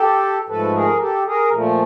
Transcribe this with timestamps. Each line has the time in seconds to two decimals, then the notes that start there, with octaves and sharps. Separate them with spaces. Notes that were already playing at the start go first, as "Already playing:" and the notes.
Already playing: G4 A4
0.48 G#2 F3 A3 A4 B4
0.74 G#4 A#4
1.00 G4 A4
1.26 G#4 A#4
1.52 A#2 F3 A3